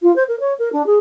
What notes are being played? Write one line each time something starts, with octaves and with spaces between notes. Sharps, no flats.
F4
C5
A#4
C#5
A#4
D4
G#4